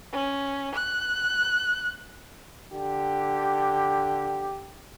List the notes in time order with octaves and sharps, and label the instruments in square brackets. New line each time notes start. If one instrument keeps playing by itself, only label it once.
[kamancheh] C#4
F#6
[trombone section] D3 G4